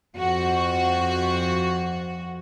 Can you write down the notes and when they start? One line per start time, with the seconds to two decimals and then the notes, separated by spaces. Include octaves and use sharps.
0.16 F2 F#4